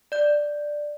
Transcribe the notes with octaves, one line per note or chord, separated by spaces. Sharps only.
D5 G6